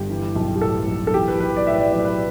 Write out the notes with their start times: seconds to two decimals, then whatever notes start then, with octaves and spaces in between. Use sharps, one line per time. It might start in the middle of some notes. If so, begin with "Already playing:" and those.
Already playing: G1 G2 G4
0.10 E3
0.36 B1
0.56 G4
0.61 A2 A4
0.88 B1
1.07 A4
1.14 E3 G4
1.28 B4
1.40 B1 B4
1.57 D5
1.66 A2 E5
1.74 B4
1.79 D5
1.92 B1 D5
2.05 B4